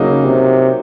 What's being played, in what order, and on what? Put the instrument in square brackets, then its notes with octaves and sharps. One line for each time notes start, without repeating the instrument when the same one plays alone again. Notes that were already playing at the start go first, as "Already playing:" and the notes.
Already playing: [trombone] C#3 [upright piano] F#3 A#3 D#4
[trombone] C3